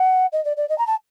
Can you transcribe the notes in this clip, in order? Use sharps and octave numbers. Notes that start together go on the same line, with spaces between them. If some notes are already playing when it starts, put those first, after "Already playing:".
Already playing: F#5
D#5
D5
D5
D#5
A#5
A5